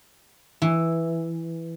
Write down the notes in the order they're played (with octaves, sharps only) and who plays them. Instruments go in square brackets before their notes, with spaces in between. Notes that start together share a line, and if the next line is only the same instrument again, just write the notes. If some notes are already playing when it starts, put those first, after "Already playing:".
[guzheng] E3